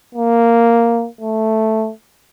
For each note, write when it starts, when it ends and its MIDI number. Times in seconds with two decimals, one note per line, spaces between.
0.15 1.07 58
1.21 1.91 57